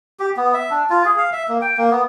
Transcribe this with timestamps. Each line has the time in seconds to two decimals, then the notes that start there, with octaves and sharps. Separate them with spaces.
0.20 G4
0.37 B3
0.54 E5
0.70 D4
0.90 F4
1.05 G#4
1.18 F5
1.33 E5
1.48 A#3
1.61 G5
1.77 A#3
1.91 B3